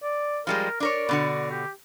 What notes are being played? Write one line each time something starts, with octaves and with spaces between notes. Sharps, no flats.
D5
F3 G3 G#3 A#4
D4 A#4 C#5 D5
B2 D3 F#4
G4